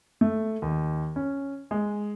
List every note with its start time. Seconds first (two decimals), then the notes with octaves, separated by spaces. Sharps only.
0.21 A3
0.62 D#2
1.16 C#4
1.71 G#3